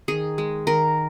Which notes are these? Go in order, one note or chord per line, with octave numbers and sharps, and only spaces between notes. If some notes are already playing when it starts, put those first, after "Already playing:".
D#3 G#4
G#3
D#3 A#4